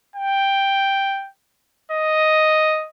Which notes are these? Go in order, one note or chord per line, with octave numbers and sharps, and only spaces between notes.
G5
D#5